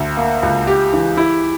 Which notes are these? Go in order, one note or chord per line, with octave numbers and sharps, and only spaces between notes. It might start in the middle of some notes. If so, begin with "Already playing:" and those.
Already playing: D2
A#3
C#2
G4
E3
E4